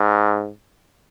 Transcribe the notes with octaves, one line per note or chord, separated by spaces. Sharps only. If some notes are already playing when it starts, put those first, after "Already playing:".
Already playing: G#2